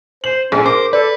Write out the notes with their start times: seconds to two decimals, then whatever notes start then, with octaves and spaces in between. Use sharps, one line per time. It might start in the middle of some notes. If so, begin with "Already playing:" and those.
0.24 C5 F#7
0.52 A#1 C#4 G#4
0.66 A#4 C5 D6
0.93 A4 B4 D5